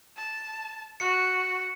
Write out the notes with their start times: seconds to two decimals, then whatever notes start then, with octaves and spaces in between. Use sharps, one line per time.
0.17 A5
1.00 F#4 C#7